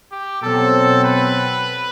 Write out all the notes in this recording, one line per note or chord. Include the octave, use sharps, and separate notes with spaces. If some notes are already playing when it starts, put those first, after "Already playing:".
G4
B2 F#3 C4 A4
B4